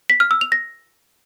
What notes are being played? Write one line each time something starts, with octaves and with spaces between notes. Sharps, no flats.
B6
F6
E6
F7
A#6